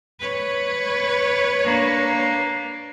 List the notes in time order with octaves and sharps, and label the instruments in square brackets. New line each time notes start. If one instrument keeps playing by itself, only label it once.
[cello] B4 C#5
[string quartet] A#3 D4